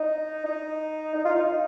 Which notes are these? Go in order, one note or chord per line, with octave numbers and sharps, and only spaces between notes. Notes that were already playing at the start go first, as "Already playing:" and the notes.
Already playing: D#4
D#4
D#4
F4
D#4